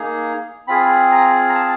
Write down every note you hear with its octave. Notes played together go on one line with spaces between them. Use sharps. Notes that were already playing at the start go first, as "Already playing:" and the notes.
Already playing: A#3 D#4 G#4
C4 F4 G#4 B5
A#5
A#5
A5